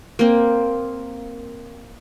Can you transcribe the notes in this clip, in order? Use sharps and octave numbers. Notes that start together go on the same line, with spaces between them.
A#3 C4